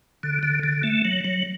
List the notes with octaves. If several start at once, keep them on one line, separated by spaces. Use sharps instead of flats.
D3
D3
D3
A3
F#3
F#3